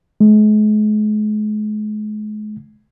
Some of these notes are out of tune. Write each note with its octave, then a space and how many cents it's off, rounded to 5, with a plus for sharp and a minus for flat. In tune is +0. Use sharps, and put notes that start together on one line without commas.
G#3 +40